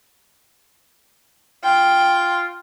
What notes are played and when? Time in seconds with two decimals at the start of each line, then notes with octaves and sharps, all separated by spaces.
1.64 F4 G5